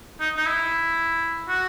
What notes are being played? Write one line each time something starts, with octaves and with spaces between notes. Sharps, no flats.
D#4
D#4
E4
F#4